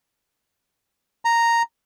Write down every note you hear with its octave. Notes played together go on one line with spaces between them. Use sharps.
A#5